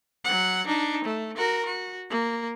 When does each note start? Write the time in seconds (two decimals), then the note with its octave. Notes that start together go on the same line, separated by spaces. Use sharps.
0.24 F#3 F#5
0.66 D4 D#4
1.05 A3
1.36 F#4 A#4
1.65 F#4
2.10 A#3